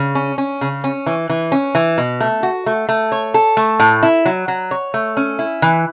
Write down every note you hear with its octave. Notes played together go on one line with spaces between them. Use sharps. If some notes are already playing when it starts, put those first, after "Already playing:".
Already playing: C#3
C#4
C#4
C#3
C#4
E3
E3
C#4
E3
B2
A3
F#4
A3
A3
C#5
A4
A3
A2
E4
F#3
F#3
C#5
A3
C#4
E4
E3